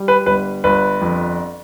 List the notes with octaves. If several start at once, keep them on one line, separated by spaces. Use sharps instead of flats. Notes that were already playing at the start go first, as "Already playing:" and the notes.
Already playing: G3
B4
G1 B4
G1 B4
F2